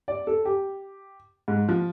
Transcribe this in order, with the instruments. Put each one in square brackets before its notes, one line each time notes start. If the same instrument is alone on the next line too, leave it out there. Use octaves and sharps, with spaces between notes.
[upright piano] D5
A4
G4
G#2
F3